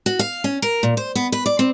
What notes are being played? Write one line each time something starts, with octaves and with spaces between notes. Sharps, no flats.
F#4
F5
C#4
A#4
A#2
C5
B3
B4
D5
C4